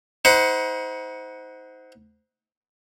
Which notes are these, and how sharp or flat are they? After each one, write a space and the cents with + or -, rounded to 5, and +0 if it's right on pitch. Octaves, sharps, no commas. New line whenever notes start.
D#4 +35 C5 -15 F#5 +0